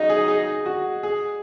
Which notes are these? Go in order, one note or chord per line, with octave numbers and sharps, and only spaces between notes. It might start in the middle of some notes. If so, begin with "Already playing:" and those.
Already playing: C#3 F#3 D#4 D#5
G#4
G#4
F#4
G#4